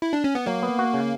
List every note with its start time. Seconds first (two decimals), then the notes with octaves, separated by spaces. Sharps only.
0.02 E4
0.13 D4
0.24 C#4
0.35 B3
0.46 F#3 A#3
0.63 B3
0.79 F#4
0.94 C#3